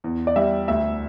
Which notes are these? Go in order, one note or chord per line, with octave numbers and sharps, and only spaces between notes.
E2
D5
G3 E5
D2 E5